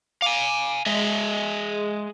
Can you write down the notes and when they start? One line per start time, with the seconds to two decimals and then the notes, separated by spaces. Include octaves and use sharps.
0.22 F5 G#5 D6
0.86 G#3 G#4 D#5 E5